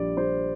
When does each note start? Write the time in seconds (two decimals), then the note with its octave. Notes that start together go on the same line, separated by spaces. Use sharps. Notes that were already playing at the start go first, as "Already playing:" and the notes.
Already playing: A#1 G3 D5
0.17 G3 C5